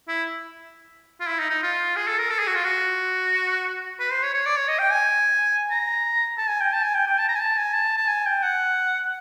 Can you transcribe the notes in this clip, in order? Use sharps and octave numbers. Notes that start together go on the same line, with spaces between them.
E4
F4
E4
D#4
D#4
F4
G#4
A4
A#4
A4
G#4
F#4
F4
F#4
B4
C5
C#5
C#5
D5
C#5
D#5
G5
G#5
A#5
A5
G#5
G5
A5
G#5
G5
G5
A5
A#5
G#5
A5
G#5
A5
A5
G#5
G5
F#5